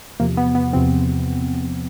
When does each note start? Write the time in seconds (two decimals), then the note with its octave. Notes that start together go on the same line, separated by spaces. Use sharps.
0.20 E2 C3 F3 A#3
0.37 B3
0.55 B3
0.73 E2 C3 F3 C4